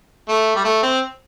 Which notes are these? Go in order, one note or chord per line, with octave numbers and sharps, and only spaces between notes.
A3
G3
A3
C4